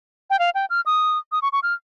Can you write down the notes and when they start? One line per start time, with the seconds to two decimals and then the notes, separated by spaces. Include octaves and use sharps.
0.30 G5
0.39 F5
0.55 G5
0.70 F6
0.86 D#6
1.32 D#6
1.42 C#6
1.52 C#6
1.63 F6